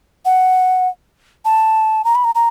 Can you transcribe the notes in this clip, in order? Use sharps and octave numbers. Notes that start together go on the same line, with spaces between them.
F#5
A5
A#5
B5
A#5
A#5